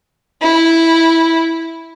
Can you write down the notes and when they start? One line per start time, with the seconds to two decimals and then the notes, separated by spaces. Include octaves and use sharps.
0.42 E4